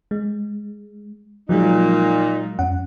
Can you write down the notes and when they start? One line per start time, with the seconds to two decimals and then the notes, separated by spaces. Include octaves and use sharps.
0.11 G#3
1.49 A#2 F3 F#3 G#3 D#4
2.59 F2 C#4 F#5